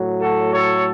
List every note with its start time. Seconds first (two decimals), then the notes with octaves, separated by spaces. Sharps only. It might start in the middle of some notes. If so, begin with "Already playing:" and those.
Already playing: A2 F#3
0.20 F#4 A4
0.53 A4 C#5